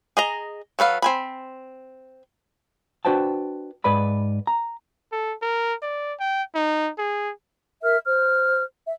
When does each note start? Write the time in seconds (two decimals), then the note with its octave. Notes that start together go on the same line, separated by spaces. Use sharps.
0.17 G#4 D#5 A#5
0.79 F#3 A4 B4 F5
1.02 C4 G#5 B5
3.05 D4 F#4 B4 C5 G5 A5
3.84 G#2 B4 D5 B5
4.47 A#5
5.12 A4
5.42 A#4
5.82 D5
6.20 G5
6.55 D#4
6.98 G#4
7.82 A#4 E5 F6
8.05 C5 F6
8.85 E5